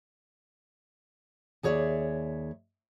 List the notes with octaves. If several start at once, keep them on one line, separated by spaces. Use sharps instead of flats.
D#2 G#4 C#5 D5 E5